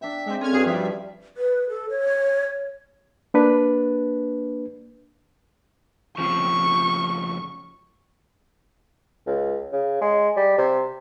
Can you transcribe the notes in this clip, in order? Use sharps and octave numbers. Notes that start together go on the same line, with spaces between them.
D4 E5 G5
G#3 C4
C4 C#4 G#4 A4 F6 G#6
G2 F#4 G#4 B4 A5
F3 G3 E5
B4
A4
C#5
A#3 D4 B4
F2 C#3 F3 C#6
C#2
C#3
G#3
G3
C3